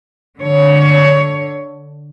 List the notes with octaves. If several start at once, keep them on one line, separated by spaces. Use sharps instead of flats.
D3 C#5